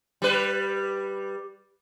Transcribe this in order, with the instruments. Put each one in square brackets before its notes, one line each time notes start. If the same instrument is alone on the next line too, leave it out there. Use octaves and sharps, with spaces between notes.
[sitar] G3 B4